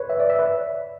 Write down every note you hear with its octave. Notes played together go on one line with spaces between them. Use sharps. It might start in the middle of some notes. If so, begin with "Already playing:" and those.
Already playing: B4 C#5
E5
D5
E5
B4